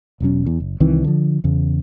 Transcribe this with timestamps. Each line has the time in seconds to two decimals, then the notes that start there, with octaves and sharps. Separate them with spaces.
0.20 E1 B2 F#3 C#4
0.46 E2
0.60 F#1
0.80 C2 D#3 E3 C4
1.04 D3 F3
1.44 E2 C#3